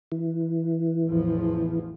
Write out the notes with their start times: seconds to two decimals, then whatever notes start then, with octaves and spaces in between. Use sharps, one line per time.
0.12 E3
1.05 A1 E2 F3